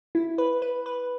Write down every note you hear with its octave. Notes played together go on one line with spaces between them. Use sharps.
E4
B4
B4
B4